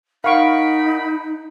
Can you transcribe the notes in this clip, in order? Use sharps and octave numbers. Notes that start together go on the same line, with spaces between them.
D#4 A#4 F5 F#5 B5 C#6 D7